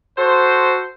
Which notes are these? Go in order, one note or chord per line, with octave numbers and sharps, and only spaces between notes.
F#4 A4 C5